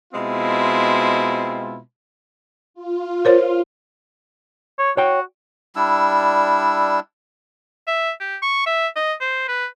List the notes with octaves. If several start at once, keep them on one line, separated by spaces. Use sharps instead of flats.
B2 G#3 C4 E4 F4
F4
A#4 C5 C#5
C#5
F#4 C#5 G5
G3 D4 E4 E6
E5
G4
C#6
E5
D#5
C5
B4